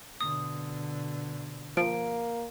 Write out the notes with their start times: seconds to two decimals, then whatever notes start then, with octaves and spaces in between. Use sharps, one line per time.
0.21 B2 D3 D#6
1.77 F3 A#3 D7